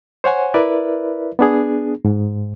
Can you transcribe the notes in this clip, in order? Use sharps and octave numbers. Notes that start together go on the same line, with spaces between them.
C5 C#5 F#5 G#5
E4 A#4 B4 D5 E5
B3 D4 G#4
G#2